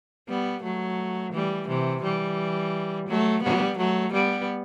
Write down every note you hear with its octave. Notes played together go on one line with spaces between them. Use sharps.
G3 B3
F#3 A3
E3 G3
C3 E3
E3 G3
F#3 A3
G3 B3
F#3 A3
G3 B3